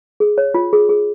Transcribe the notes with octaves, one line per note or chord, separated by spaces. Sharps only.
G#4
C#5
F4
G#4
G#4